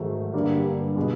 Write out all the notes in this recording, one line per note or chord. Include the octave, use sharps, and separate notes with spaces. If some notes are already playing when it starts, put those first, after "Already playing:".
Already playing: G#2 D#3 F#3 A3
G2 D3 G3 A#3
G2
B2 G#3 B3